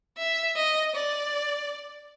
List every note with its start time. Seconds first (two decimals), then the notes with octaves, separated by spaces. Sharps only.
0.18 E5
0.56 D#5
0.94 D5